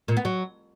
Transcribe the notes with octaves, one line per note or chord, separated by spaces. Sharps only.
A#2
B3
F#3